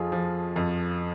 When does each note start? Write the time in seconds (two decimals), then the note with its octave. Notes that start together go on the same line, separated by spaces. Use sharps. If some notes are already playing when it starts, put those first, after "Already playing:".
Already playing: F2 F3 F4 G#4
0.12 F3
0.56 F2